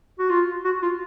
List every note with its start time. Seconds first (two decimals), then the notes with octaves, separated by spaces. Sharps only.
0.19 F#4
0.29 F4
0.64 F#4
0.82 F4